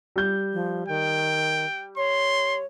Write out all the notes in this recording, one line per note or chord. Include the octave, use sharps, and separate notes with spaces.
G3 G6
F3
D#3 G5
C#5 C6